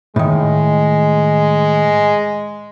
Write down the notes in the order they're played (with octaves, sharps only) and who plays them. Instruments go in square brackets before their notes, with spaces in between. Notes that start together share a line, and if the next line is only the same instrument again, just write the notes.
[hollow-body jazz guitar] A2 D#3 [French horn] G#3